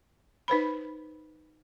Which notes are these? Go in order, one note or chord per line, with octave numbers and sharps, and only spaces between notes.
D#4 B4 C5 B5